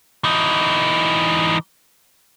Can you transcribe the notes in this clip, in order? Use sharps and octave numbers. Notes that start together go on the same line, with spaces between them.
E3 D#4